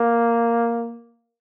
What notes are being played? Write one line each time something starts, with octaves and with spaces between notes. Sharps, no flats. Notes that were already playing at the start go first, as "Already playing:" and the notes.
Already playing: A#3